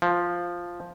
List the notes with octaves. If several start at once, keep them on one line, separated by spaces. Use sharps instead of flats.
F3